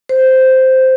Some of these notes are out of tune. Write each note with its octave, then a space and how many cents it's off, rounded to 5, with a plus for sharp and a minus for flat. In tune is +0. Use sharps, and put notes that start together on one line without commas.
C5 -5